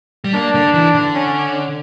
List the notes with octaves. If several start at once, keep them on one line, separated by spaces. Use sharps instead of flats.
G3
A#3 D4
D3
E3
D3
C#4